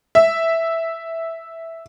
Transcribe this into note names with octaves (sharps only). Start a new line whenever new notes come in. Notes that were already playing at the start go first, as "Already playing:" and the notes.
E5